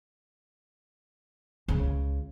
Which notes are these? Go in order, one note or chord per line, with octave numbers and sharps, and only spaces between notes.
C#2 C#3